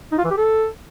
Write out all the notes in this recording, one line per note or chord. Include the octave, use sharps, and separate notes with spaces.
D#4
F4
E3
G4
A4